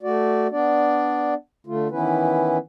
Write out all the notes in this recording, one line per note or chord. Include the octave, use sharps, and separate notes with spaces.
A3 F#4 D5
B3 D4 D5
D3 A3 F4
D#3 E3 B3 C#4 E4 B4